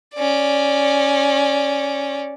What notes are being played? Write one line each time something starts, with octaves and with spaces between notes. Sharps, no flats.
C#4 D5